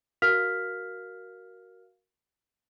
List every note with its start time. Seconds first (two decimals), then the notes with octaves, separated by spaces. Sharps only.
0.22 F#4 A#4 F5 F6 B6 F7